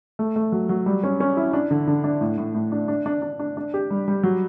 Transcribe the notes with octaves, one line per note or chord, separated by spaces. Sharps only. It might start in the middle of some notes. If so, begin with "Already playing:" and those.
A3
A3
F#3
F#3
G3
C#4
C#4
E4
D4
D3
D3
D4
A2
A2
A2
D4
D4
D4
D4
D4
D4
G4
G3
G3
F#3